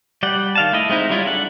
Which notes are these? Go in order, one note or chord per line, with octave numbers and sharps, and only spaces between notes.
G3 D5 F#5 G5
D#3 F5 A5
A3 E4 D#5
G#3 C4 D#4 E4
F#3 G3 E4 F4
D4 A4 F#5